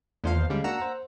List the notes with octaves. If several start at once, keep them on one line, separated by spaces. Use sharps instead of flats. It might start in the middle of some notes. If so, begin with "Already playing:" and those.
E2 A3 D4 F4 C5 F5
D#2
D3 G3 G#3 C#4 F5
A#3 D4 F#4 F#5 A#5 E6
C5